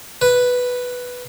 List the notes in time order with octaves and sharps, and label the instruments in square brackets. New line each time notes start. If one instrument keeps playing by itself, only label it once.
[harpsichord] B4